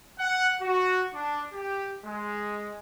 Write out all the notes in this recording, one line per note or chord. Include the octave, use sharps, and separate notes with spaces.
F#5
F#4
D4
G4
G#3